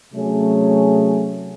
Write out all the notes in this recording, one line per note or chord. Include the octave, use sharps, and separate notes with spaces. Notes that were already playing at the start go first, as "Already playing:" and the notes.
C3 F#3 A3 C#4 G#4